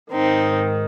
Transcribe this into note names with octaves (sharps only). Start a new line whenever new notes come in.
G#2 D#3 C4 D#4